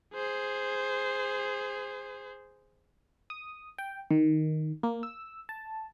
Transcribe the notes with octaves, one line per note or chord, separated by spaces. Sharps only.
G#4 C5
D#6
G5
D#3
A#3
E6
A5